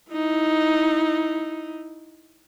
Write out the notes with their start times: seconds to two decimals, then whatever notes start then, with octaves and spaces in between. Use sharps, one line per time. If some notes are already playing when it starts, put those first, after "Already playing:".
0.12 D#4 E4